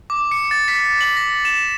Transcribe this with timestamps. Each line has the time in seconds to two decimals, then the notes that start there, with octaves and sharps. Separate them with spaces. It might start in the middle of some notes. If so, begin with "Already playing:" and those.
0.10 D6
0.31 C#7
0.51 A6
0.68 B6
1.01 F#7
1.17 A#6
1.45 E7